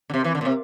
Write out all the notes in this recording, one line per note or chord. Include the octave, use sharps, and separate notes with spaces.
D3
C3
E3
D3
A#2
C3